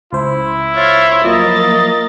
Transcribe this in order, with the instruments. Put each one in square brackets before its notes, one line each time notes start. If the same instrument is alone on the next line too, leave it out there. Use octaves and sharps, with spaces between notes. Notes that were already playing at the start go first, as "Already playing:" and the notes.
[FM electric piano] C#2 C5 [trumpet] E4
[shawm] F4 [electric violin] C#5 E5
[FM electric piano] F3 F#3 [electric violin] A#3 A6 [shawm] D#5